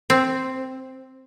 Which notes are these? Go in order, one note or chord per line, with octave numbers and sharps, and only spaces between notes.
C4